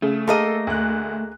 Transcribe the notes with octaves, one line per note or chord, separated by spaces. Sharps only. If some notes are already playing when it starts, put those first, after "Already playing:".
C#3 A3
A#3 G#4 A4 D#5
D2 F#6